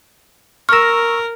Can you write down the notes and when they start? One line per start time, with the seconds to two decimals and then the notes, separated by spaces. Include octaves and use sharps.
0.69 A#4 C#6 E6 F6 A#6